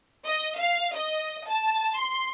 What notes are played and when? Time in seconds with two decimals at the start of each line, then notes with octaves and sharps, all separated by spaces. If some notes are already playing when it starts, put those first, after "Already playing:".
0.25 D#5
0.58 F5
0.95 D#5
1.47 A5
1.98 C6